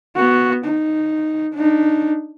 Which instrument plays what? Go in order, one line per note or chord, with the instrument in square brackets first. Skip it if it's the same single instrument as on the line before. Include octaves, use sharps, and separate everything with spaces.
[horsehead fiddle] B3 F#4
D#4
D4 D#4